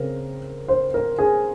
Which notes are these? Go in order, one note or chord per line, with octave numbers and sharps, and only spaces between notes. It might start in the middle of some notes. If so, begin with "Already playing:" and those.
Already playing: C#3 C4 A#4
C5
A#4
G#4